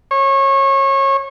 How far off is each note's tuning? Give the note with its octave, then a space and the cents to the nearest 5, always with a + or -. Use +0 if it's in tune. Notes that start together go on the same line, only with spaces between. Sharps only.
C#5 -25